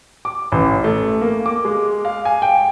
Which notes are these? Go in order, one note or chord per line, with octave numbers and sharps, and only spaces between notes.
D6
A1
A3
A#3
D6
G#3
F5
G#5
G5